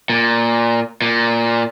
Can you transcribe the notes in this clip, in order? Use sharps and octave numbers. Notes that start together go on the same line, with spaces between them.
A#2
A#2